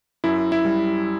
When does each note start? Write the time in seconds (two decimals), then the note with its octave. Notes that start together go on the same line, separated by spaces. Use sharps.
0.24 F#2 E4
0.52 E4
0.65 G3